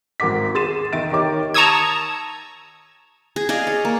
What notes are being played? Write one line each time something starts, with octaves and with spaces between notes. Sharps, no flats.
G#1 A#4 F#5 D6 B6
G#4 C6 A6 D#7 E7
D#3 E5 A6 D7
D#3 G4 A#4 C#5 D6
A5 A#5 C#6 D#6 E6 G#6
G#4
G#4 D5 D#5 F5
C#5
A#3